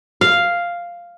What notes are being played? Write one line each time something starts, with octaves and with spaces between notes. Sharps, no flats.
F5